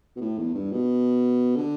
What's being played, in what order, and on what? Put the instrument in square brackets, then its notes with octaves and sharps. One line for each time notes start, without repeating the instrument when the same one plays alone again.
[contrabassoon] B2
A2
E2
G2
B2
D3